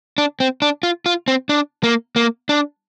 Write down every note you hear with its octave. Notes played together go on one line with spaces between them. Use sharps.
D4
C4
D4
F4
F4
C4
D4
A#3
A#3
D4